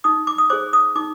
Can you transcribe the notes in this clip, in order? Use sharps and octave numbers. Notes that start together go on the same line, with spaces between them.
D#4 D#6
D6
D#6
G#4 C5 D6
D#6
D#4 D6